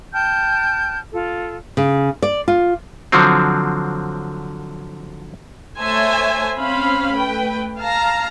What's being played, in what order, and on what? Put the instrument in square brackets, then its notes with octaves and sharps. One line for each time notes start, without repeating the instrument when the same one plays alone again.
[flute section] G5 A5 F6 G6
F4 A4
[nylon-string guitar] C#3
D5
F4
[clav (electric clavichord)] D3 F3 F#3 C4
[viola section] A3 C5 C#5 E5 G#5 A5
C4 C#4 C5 F5 B5
A3 B4 G5
F5 A5 A#5